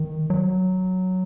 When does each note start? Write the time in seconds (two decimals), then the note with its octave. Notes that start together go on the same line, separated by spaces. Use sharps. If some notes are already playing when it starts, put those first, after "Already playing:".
Already playing: D#3
0.30 F#3